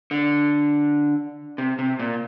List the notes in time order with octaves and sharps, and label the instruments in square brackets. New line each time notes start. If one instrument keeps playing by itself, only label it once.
[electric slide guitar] D3
C3
C3
A#2